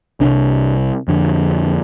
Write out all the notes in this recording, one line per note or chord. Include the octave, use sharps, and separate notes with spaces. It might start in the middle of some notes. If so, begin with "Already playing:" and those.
C2 C3 D4
F2 D3